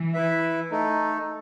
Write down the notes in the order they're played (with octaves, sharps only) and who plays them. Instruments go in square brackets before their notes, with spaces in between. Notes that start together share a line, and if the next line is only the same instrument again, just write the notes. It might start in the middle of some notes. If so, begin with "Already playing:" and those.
Already playing: [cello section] E3
[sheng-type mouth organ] E4 B4 E5
A3 D#4 A4